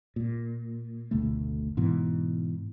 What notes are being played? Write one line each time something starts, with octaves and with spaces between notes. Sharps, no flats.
A#2
F#1 D2 B2 A3
G#2 B2 E3